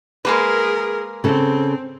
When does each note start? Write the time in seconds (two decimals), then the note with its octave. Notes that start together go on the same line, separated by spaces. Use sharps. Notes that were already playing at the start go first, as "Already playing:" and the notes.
0.25 G#3 A#3 G#4 A#4 B4
1.24 C#3 C4 A4